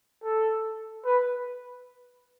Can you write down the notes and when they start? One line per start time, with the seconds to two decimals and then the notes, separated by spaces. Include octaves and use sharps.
0.24 A4
1.05 B4